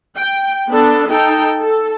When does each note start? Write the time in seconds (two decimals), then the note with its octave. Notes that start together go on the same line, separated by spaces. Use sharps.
0.17 G5
0.70 B3 D4 A4
1.10 D#4 A4 G5
1.61 A4